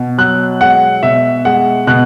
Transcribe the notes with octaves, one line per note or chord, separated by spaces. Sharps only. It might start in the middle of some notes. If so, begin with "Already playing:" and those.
Already playing: B2
F#3 F#6
G#3 F#5
B2 E5
G#3 F#5
B2 F#6